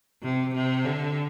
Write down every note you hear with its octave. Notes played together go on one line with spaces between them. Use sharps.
C3
C3
D3